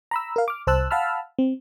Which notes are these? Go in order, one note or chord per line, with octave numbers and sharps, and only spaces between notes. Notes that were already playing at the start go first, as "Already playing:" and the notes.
A#5 B5 E6
A#4 F5
D6 F6
C2 C5 A5 E6 F#6
F5 F#5 A5 B5 E6 F6
C4